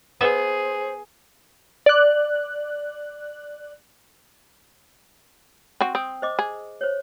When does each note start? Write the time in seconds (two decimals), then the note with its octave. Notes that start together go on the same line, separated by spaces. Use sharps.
0.21 B3 G#4 B4 C5 E5
1.86 D5 F#6
5.81 C4 F#4
5.95 C4 D#6
6.22 C5 D#5 D6
6.39 G#4
6.81 C5 C#5